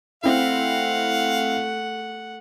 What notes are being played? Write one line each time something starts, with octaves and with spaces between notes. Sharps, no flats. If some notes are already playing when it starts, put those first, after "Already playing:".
A3 C4 E4 F5 F#5